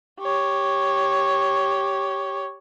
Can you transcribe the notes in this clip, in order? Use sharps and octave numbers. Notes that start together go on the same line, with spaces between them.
G4 C#5